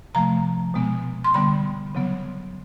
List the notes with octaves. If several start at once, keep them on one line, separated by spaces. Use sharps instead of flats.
C3 F3 A3 A#5
B2 G#3 B3
C6
D3 G3 B3 B5
C#3 F#3 B3